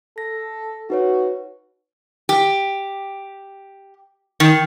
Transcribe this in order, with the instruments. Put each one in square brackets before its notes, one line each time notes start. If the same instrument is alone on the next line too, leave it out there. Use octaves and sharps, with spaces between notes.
[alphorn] A4 [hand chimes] A#6
[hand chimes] D#4 B4 C#5 [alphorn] F#4
[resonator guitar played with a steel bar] G4
D#3